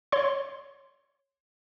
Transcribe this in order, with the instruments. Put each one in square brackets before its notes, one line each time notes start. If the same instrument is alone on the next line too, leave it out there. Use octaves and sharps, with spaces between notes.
[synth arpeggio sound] C#5 C6